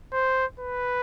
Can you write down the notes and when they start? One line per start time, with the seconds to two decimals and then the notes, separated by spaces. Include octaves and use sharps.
0.13 C5
0.60 B4